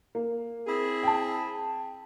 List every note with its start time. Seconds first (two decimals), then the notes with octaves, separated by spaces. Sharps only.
0.15 A#3
0.67 C4 E4 G#4
1.03 G5 A5